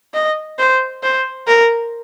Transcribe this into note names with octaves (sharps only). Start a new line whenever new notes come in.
D#5
C5
C5
A#4